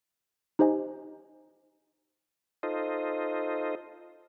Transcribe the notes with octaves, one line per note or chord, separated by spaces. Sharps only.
D#4 G4 C5 D#5 G#5
D#4 F4 A4 C5 D#5